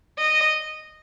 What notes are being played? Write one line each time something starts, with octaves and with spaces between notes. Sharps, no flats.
D#5